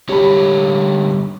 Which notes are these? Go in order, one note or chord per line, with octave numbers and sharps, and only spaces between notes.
D3 G3 G4 C#5 B5